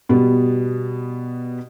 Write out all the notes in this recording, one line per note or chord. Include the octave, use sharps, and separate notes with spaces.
B2 G3 B3